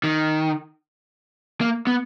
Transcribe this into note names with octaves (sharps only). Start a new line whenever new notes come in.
D#3
A#3
B3